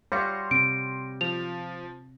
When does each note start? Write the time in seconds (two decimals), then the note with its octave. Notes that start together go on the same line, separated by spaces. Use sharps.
0.12 G3 C#5 F5 F#5 C6 A#6 C#7
0.51 C3 C4 D7
1.21 F3 F7